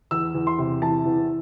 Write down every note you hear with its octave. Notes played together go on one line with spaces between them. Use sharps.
E2 E6
E2
C6
C3
E3 A5
E2